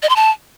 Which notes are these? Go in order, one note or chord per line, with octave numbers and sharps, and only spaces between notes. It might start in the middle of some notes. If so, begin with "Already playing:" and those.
D#5
C6
A5